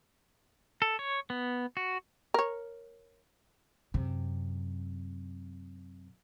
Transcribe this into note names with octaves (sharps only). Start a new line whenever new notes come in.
A4
C#5
B3
F#4
A#4 C#5
F#2 C3